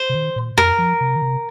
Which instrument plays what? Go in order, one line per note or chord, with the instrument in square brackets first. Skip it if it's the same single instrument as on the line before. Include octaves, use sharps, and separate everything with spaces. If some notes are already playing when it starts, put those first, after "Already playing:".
Already playing: [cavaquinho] C5
[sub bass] C3
D#3
A#2
[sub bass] F2 [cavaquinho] A#4
[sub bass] F3
C3
D#3
C3